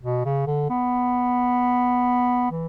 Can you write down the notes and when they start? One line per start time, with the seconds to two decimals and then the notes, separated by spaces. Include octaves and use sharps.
0.01 B2
0.25 C#3
0.47 D3
0.70 B3
2.51 E3